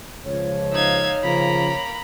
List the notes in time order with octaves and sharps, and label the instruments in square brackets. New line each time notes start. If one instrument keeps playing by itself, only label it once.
[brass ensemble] C#2 F3 [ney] C#5
[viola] D#4 F5 [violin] E5 G#6
[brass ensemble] C#3 F3 [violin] A#3 [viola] A#5 B5